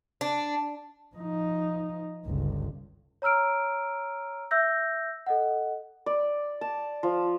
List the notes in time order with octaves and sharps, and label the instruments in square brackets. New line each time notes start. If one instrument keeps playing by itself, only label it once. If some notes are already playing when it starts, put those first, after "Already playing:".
[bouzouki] D4
[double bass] F3 D#4
G1 C#2
[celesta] C#5 A#5 E6 F6 D7
E5 E6 G6 A#6
A4 D#5 F#5
[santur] D5
A5
F3